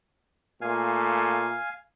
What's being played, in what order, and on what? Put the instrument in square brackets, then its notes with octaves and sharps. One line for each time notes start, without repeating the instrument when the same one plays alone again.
[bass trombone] A#2 [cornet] A3 [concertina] F5 G#5